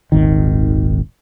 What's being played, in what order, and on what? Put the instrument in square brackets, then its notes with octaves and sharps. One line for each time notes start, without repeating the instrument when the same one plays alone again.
[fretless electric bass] D#1 G#1 D#3